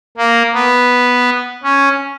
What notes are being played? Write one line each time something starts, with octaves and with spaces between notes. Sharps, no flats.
A#3
B3
C#4